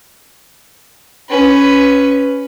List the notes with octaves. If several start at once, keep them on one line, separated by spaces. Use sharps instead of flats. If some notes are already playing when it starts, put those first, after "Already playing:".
C#4 B4